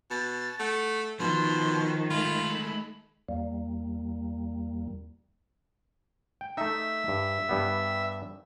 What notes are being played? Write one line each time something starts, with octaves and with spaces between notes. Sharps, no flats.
B2 A6
A3 F#5
B2 D#3 F3 C6
G#3 A3 F4 B5
E2 G3 A#3
G5
A3 D#4 E5
G2
G2 G3 B3